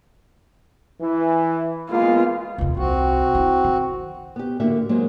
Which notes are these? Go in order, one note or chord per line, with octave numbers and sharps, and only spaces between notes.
E3
G#3 A#3 B3 F4
F1 D#2
C2 C4 F#4
E4
D#3
B3 G4
D2 A2 D3 A#3 F#4 E5
F#3 G#3 A#3 D#4 C5